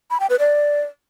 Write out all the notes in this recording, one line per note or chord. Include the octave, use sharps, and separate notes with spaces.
B5
G5
B4
D5